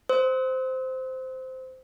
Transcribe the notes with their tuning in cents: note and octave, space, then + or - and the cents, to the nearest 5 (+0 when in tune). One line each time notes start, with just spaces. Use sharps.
C5 -10 E6 -45